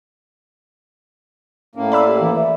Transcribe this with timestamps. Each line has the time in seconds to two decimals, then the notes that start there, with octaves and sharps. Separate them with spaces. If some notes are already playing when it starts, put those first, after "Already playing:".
1.75 A2 A#3 C#4
1.92 D5 B5 E6
2.06 G4
2.20 E3
2.35 E5